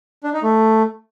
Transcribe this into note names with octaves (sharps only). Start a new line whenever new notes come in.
D4
D#4
A3